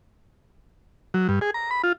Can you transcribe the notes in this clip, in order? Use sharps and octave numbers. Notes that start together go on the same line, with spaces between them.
F#3
G2
G#4
A#5
B5
F4